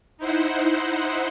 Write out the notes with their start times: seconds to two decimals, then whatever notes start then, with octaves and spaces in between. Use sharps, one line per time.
0.18 D#4 E4 C5 F#5